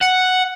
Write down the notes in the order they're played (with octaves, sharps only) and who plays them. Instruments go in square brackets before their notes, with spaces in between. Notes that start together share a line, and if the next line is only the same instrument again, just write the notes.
[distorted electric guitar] F#5